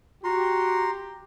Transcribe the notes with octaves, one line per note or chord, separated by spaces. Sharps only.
F#4 G4 A#5 C6